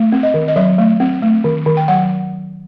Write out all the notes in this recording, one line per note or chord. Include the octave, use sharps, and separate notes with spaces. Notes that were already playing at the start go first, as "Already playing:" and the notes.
Already playing: A3
C4
D#5
D#3
D#5
F#3 E5
A3
C4
A3
D#3
D#3
G5
F#3 F#5